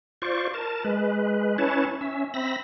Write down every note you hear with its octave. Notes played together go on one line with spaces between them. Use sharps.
F4 C5 D5 C#6
A#4 A5
G#3 B4
C#4 E4 B4 C#5 A5
C#4 E5
C4 E5 B5 A#6